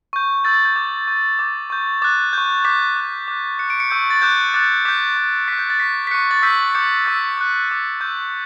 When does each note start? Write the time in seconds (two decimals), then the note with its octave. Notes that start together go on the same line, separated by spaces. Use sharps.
0.13 C#6 G6
0.44 C#6 E6 G6 A6
0.54 A6
0.65 G6
0.76 D6 G6
1.07 C#6 G6
1.39 D6 G6
1.70 C#6 G6
2.02 D6 F#6 A6
2.33 C#6 G6
2.65 D6 G6 B6
2.96 D6 F#6
3.28 D6 F#6
3.59 D6 F#6 C#7
3.70 D7
3.80 C#7
3.91 C#6 E6 G6
4.10 A6
4.22 D6 F#6 G6
4.54 D6 F#6 A6
4.85 D6 G6 B6
5.17 C#6 G6
5.48 C#6 F#6 B6
5.59 G6
5.70 A6
5.80 C#6 F#6 B6
6.07 B6
6.11 C#6 F#6 C#7
6.31 A6
6.42 C#6 E6 G6 B6
6.75 D6 G6 C#7
7.06 C#6 E6 G6 B6
7.37 D6 F#6
7.69 D6 F#6
8.01 C#6 E6 G6